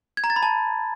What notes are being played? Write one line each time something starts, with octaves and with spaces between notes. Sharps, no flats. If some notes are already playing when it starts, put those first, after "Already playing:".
G#6
A#5
A6
B5
A5